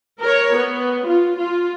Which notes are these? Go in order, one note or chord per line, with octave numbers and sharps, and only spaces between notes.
A#4 C#5
B3
F4
F4